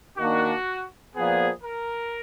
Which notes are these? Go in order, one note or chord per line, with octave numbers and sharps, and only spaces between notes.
D#3 A#3 D4 F#4
A#2 F3 B3 G#4
A#4